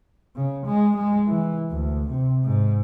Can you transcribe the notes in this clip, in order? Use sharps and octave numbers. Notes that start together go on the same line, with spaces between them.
C#3
G#3
G#3
E3
D2
C3
G#2